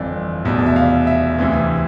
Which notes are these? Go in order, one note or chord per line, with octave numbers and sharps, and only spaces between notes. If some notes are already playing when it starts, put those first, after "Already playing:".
Already playing: G1 F2 E3 D5
F1 E2 B2
D5
E5
F5
E5
D2 C3 E3